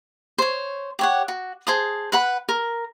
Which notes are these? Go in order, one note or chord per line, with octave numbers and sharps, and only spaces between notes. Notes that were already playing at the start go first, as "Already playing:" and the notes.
C5 C#5
G4 C#5 F#5
F#4
G#4 C5 A5 D#6
B4 F#5 B5
A#4